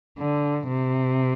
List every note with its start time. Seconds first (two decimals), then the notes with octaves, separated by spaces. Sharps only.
0.18 D3
0.67 C3